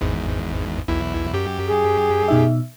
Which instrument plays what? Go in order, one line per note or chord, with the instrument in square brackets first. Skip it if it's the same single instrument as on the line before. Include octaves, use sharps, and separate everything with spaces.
[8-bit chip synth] G#1 E2 G#2
B1 E2 E4
F#2 G4
[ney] G#4
[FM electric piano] B2 D#4 E5